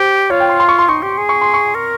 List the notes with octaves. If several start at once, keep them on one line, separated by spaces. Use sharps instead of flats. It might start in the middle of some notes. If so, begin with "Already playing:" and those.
Already playing: G4 C5
F4 C#5
G5
C6
C6
C#6
C6
D#4 C#6
G4
G#4
C#6
C6
C#6
A#4